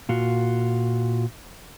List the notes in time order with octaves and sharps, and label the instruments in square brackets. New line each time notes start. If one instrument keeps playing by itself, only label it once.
[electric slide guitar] A#2 F4 F#4